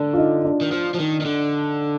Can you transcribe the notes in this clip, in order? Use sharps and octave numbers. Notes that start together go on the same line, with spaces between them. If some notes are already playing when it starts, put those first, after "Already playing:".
Already playing: D3 D4
F4
D#4
D4
D#3
F3
F3
D#3
D#3
D3